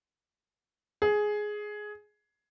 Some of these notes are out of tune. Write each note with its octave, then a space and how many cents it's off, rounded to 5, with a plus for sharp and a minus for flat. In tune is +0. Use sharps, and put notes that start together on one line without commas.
G#4 +10